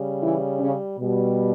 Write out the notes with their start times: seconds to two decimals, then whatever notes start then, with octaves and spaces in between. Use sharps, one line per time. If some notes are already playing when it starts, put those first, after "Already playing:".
Already playing: C#3 G3
0.22 E3 E4
0.60 C#3 C#4
0.98 B2 G3